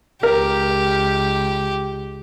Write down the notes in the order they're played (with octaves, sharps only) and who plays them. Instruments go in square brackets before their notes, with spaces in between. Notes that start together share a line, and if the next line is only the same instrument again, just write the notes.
[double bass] C#2 [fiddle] G4 [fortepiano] A#4